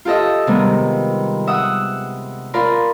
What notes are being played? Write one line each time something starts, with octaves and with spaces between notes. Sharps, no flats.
F4 G4 A4 D#5 E5
C3 D#3 G3 G#3 B3
E5 F#5 D#6 E6
F4 A#4 D5 B5 C6